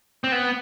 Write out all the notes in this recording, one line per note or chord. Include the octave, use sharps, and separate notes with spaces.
C4
B3